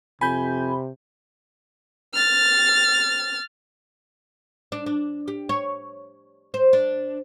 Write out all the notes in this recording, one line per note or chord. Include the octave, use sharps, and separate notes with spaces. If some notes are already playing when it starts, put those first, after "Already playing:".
F2 C3 G#5 B5 G6
F6 A6
D4
D4
G4
C#5
C5
D4